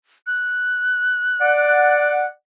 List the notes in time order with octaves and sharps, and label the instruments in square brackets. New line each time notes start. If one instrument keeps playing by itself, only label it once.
[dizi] F#6
[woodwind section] D5 F#5